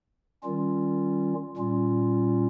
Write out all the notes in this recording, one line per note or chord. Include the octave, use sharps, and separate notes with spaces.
D#3 G3 C#4 F4
A#2 G3 C#4 F4